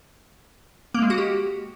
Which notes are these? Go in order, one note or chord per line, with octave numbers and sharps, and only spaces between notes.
A#3
G#3
F#4
G4